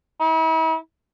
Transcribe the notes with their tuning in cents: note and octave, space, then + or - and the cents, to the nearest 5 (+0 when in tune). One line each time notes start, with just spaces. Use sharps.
E4 -45